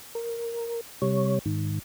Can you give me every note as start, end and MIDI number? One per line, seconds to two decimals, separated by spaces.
0.15 0.81 70
1.02 1.39 48
1.02 1.39 55
1.02 1.39 73
1.46 1.79 44
1.46 1.79 51